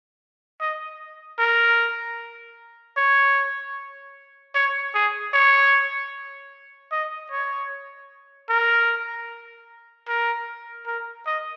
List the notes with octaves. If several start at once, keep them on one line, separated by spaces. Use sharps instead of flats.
D#5
A#4
C#5
C#5
G#4
C#5
D#5
C#5
A#4
A#4
A#4
D#5